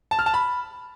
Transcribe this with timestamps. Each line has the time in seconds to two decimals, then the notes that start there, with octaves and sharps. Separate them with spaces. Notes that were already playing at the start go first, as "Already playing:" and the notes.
0.11 A5
0.19 F6
0.26 A5
0.34 B5